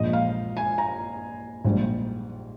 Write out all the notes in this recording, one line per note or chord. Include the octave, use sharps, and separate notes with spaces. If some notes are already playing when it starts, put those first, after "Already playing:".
Already playing: A#1 A#2 F3 G#3 D#5
F5
G#5
A#5
A#1 G#2 G3